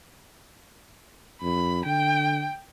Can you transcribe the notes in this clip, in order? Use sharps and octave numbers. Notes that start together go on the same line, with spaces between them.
F2 B5
D3 G5